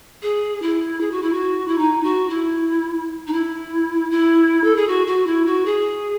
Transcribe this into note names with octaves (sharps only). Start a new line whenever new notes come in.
G#4
E4
G#4
F#4
E4
F#4
E4
D#4
F#4
E4
D#4
E4
E4
A4
G#4
F#4
F#4
E4
F#4
G#4